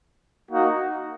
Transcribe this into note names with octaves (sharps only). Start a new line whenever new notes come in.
A#3 D#4 F#4